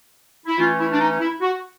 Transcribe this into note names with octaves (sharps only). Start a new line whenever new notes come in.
E4
E3 A3 C#4 F4
E4
D4
D#4
E4
F#4